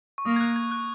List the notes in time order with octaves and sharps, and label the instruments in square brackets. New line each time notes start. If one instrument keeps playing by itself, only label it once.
[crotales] C#6
[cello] A#3 [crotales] D#6
[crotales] G#6
F#6
G#6
F#6